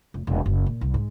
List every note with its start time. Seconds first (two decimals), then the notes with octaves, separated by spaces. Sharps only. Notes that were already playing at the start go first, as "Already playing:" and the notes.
0.14 F1
0.27 E1
0.46 F#1
0.66 A#2
0.81 C2
0.94 G#2